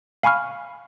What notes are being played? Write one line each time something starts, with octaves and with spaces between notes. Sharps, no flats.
F5 G#5 B5 C#6 F6